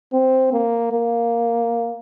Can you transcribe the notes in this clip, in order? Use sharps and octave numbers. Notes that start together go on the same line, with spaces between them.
C4
A#3
A#3